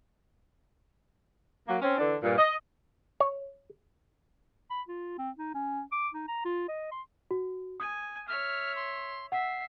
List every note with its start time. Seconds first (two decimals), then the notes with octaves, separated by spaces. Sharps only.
1.68 F#3 A#3
1.82 C4 C#4
1.98 D3 E3 D4
2.23 G2 A#2
2.38 D#5
3.20 C#5
4.70 B5
4.88 F4
5.18 C4
5.38 D#4
5.54 C#4
5.92 D6
6.14 D#4
6.28 A#5
6.45 F4
6.68 D#5
6.91 C6
7.31 F#4
7.80 G#5 D#6
8.28 C#5 E5 F6
8.76 C6
9.32 E5 F#5 C7